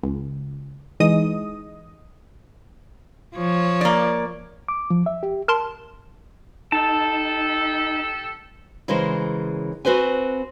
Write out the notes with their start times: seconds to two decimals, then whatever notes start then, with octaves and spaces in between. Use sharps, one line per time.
0.03 C#2
1.00 E3 G#3 D#4 D#5 D#6
3.35 F3 C#5
3.81 A#3 D5
4.68 D6
4.90 F3
5.06 E5
5.23 G4
5.48 A#4 A5 C6
6.72 D#4 G4 A4 A5
8.88 C#3 E3 G#3 A#4 C5
9.85 C4 F#4 B4 C5 G#5